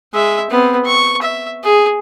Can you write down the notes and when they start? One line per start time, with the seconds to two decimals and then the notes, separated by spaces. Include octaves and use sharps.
0.13 G#3 E5
0.50 B3 C4
0.85 C#6
1.22 E5
1.63 G#4